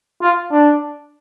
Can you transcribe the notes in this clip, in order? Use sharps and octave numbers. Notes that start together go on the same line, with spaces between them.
F4
D4